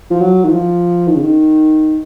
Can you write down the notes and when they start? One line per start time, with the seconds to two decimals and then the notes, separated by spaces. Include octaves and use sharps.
0.10 F3
0.21 F#3
0.45 D#3
0.51 F3
1.08 D#3
1.15 C#3
1.22 D#3